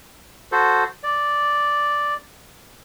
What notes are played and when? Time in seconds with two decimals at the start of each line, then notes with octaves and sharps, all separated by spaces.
0.52 F#4 A4 C5
1.03 D5